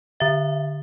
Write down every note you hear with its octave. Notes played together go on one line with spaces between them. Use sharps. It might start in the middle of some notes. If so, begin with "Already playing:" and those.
D3 E5